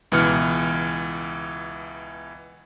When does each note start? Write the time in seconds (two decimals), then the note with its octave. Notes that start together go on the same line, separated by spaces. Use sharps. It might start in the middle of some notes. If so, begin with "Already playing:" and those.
0.12 C#2 B2 E3 F6 C#7